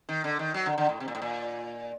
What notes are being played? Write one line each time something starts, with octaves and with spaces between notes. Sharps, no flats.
D#3
D3
D#3
F#3
D3
D3
A2
C3
A#2
A2
A#2